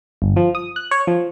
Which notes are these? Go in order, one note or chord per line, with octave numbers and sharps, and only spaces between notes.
G1
F3
D#6
F#6
C#5
F3